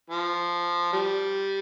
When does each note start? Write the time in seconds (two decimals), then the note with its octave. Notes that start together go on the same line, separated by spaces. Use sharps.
0.10 F3
0.93 G3